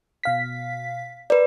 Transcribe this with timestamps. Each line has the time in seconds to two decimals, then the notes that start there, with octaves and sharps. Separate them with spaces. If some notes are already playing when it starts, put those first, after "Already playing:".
0.24 B2 F5 B6
1.30 A#4 B4 D5